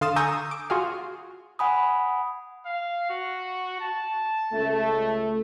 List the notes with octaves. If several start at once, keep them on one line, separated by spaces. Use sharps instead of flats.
D3 F5 C6 D#6 A6 E7
G#5 A#5 C#6 D#6 E6 G6
D6
F4 F#4 G#4 F5
F#5 G#5 B5 D#6
F5
F#4
A5
C#2 A3